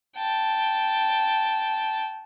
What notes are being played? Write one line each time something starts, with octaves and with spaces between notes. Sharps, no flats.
G5 A5